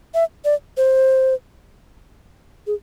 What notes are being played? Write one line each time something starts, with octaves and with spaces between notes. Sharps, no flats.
E5
D5
C5
G#4